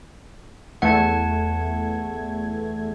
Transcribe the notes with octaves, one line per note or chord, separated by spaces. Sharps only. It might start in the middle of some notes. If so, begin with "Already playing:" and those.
E2 A3 F#5 A5 G#6